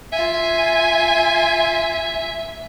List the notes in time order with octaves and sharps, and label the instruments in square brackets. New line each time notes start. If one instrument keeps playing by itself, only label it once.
[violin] F4 G#5 [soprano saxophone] E5